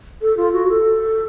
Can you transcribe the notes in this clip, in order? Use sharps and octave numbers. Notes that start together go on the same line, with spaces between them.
A4
F4
F#4
A4